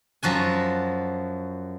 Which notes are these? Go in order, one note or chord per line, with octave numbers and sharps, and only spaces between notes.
F#2 F3 F#4 G#5